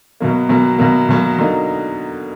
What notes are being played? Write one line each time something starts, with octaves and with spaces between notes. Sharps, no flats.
B2 F#3 A#3
B2 F#3 A#3
B2 F#3 A#3
B2 F#3 A#3
D3 F#3 A#3 D#4